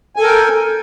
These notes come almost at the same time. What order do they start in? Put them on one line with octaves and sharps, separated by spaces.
G#5 A4 A#4 G5